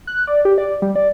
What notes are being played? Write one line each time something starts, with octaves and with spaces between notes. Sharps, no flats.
F#6
D5
G4
D5
G3
D5